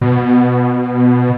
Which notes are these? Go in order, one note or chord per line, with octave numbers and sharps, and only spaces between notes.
B2